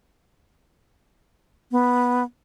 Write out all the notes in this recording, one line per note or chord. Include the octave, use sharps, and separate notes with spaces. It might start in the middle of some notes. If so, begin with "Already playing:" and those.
B3